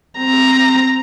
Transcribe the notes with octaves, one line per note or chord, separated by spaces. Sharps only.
C4 A#5